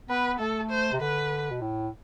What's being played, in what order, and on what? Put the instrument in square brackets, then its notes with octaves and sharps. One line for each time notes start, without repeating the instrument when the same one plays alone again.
[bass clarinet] B3 [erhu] B4
[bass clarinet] A3 [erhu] A4
[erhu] C5
[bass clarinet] C3
[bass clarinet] D3 [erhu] B4
[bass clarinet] B2
A2